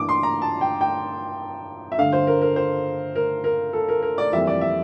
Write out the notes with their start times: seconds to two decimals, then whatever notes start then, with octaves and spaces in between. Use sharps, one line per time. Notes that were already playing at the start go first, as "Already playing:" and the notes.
Already playing: G2 E3 A#3 D6
0.09 C6
0.23 A#5
0.42 A5
0.61 G5
0.81 G5
1.92 E5
1.98 G2 D3 A3 F5
2.13 C5
2.27 A#4
2.42 A#4
2.56 C5
3.15 A#4
3.44 A#4
3.73 A4
3.88 A#4
4.02 A#4
4.18 D5
4.33 F2 E3 G3 A#3 E5
4.47 D5
4.61 E5